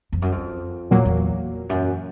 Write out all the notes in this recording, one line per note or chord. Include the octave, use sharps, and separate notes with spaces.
F2
F#2
F2
E2 A#2 F#3 A#3
E2
F#2